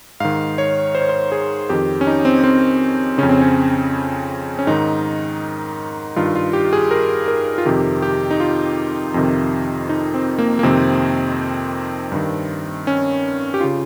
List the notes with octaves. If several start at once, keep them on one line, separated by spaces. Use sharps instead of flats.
G#2 D#3 F5
C#5
C5
C#5
C5
G#4
F2 D#3 G4
C#4
D#4
C4
C4
F2 C#3 C#4
C4
C#4
C#4
G#2 D#3 D#4
G2 D#3 F4
F4
G4
G#4
A#4
A#4
F4
F2 C3 D#3 G4
G4
D#4
F4
F2 C3 D#3
D#4
C4
A#3
A#3
F2 C3 D#3 C4
G2 D#3
C#4
G4
C#3 F4